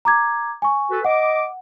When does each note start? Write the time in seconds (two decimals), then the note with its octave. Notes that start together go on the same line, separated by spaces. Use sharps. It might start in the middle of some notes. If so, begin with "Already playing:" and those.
0.05 A#5 D6 G#6
0.62 G#5 C#6
0.90 F#4 A4 B4
1.05 D#5 F#5 D6